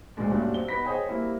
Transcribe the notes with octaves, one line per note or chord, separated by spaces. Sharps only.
D2 G#2 B2 G#3 D4
G2 A#2 F#3 A3 C#4 D4
C4 G4 G7
B3 D#4 B4 B5 A#6 B6
G#4 C5 C#5 D#5 G5 G#5
G3 A#3 C4 E4